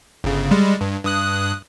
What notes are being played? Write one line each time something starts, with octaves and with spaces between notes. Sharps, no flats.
G1 C#3
G3 G#3
G2
G2 D#6 F#6